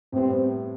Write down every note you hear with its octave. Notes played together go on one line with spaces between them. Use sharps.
A2 G3 B3 C4